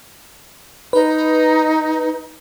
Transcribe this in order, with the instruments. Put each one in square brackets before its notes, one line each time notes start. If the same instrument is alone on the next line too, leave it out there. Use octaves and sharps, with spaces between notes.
[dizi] D#4 [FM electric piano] B4